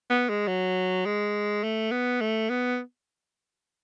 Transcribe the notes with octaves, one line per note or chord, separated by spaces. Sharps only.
B3
G#3
F#3
G#3
A3
B3
A3
B3